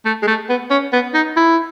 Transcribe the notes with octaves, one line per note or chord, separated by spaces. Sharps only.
A3
G#3
A3
B3
C#4
B3
D#4
E4